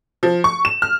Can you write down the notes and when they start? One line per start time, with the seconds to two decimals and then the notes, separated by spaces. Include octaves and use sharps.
0.23 F3
0.44 C#6
0.65 E7
0.82 F6